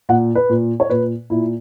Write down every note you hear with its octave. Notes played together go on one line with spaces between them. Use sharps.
A#2 F#5
B4
A#2
C#5
A#2 B4
A#2 E4